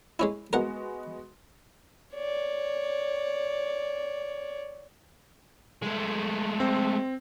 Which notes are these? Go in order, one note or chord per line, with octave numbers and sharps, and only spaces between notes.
G#3 C#4 E4
G#3 B3 F#4 A#4 F#5
C#5 D5
G#3 A3
C4